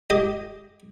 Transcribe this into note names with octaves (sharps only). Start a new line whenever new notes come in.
G4 D#5